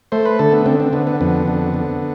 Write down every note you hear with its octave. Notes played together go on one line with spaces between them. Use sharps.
A3 C5
B4
D3 A4
B3
D3 C4
C4
D3 B3
B3
F2 B3
D3
D3